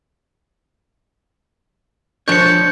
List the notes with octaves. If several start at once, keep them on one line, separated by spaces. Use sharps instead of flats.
F3 D4 C#5 G6 C#7